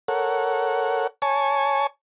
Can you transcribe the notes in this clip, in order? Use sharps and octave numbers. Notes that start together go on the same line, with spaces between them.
A4 A#4 C#5 F#5
C#5 G#5 A5 C#6